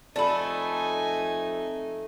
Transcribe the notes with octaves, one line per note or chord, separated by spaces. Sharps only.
F2 A3 D#4 A4 D5 G#5 B5